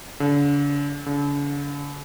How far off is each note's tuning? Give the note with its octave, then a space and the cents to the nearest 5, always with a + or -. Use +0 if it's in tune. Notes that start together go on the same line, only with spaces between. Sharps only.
D3 -40
D3 -45